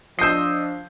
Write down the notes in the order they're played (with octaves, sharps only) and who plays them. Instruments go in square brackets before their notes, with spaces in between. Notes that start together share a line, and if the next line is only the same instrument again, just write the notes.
[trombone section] F3 D4 [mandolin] D#5 E6 [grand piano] G6 C7